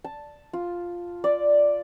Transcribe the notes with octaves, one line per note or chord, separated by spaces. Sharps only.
A5
F4
D5